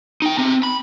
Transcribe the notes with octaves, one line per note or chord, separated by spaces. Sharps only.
D#4 G5
C4 A#5
B5